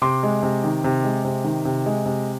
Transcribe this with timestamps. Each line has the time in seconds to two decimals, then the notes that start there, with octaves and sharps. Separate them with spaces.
0.02 C3 C6 D6
0.23 G#3
0.43 C3
0.64 D#3
0.84 C3
1.04 G#3
1.25 C3
1.44 D#3
1.65 C3
1.86 G#3
2.06 C3